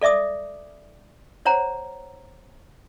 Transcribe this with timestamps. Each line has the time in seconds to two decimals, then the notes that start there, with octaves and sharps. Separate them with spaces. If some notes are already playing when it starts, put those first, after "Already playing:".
0.01 A4 D5 E5 D6 D#6
1.46 C5 C#5 F#5 A#5